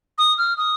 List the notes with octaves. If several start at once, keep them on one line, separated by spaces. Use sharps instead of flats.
D#6
F6
D#6